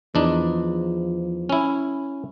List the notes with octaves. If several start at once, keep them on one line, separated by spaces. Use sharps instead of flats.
E2 F3 D4 D#4
C#4 E4